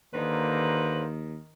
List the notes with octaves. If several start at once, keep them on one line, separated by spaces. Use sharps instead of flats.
D#2 D3 D#3 A#3 B4 C5